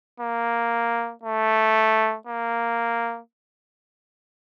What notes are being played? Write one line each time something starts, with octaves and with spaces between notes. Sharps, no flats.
A#3
A3
A#3